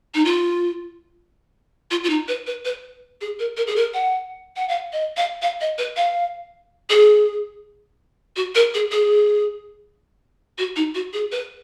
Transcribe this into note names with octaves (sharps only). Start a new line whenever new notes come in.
D#4
F4
F4
F4
D#4
B4
B4
B4
G#4
A#4
A#4
G#4
A#4
F#5
F#5
F5
D#5
F5
F5
D#5
B4
F5
G#4
F#4
A#4
G#4
G#4
F#4
D#4
F#4
G#4
B4